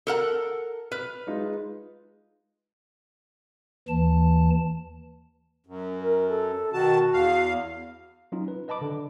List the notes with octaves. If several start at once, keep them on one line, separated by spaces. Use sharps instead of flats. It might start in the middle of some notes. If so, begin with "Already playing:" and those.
A4 A#4 F#5
B4 F6
G#3 D#4 F4
D#2 E3 A5
F#2
A#4
A4
B2 D#3 F#4 A5
E2 F5
F#3 C#4 D#4 F4
B4
B4 D#5 A5 B5 D6
D3